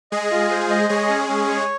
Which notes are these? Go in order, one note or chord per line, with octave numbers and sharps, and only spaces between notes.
G#3 G#4 D#5
F4
C5
D#5
G#3 G#4 C#5
C#4
C#4
C#5